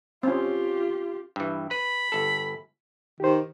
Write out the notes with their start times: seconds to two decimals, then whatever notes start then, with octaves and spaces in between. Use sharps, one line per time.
0.23 C4 C#4 F4 G4
1.36 G2 E3
1.71 B4 B5
2.12 G1 A4
3.20 D#3 G4 C5